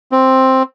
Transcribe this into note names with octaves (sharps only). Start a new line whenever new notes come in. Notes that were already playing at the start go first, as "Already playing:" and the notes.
C4